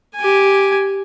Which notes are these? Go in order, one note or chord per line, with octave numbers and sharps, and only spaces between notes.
G4 G#5